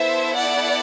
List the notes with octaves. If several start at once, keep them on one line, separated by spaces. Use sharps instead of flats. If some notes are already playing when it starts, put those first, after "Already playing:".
Already playing: B3 E4 A4 C5 E5
D5 F#5